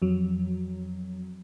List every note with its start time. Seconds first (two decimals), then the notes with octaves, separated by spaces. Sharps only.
0.02 F2 F#3